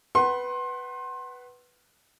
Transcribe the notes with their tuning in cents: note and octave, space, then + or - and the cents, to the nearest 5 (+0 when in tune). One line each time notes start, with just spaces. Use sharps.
B4 +0 F#5 +25 C6 +25